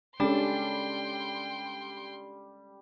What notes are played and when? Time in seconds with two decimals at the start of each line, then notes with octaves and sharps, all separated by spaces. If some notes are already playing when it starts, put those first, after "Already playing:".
0.20 G3 G#3 C#4 D4 A4 G5 C6